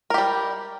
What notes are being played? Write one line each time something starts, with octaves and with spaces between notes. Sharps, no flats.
G3 G4 A#4